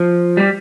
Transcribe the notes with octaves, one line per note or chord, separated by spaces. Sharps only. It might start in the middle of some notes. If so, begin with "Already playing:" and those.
Already playing: F3
G3